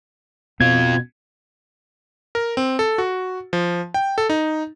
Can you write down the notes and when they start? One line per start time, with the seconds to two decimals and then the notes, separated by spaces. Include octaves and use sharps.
0.61 B2 C4 F4 G#6
2.35 A#4
2.57 C4
2.79 A4
2.98 F#4
3.53 F3
3.94 G5
4.18 A4
4.30 D#4